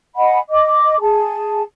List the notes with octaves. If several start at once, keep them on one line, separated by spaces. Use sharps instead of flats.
D#5 F#5 G#5 B5
D#5 D6
G#4 G#5 A5